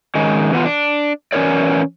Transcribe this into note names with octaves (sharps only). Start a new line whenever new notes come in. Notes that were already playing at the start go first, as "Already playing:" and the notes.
D#3 G#3 C#4
E3 B3 F4
D4
E3 C#4 E4 A#4 C#5 D5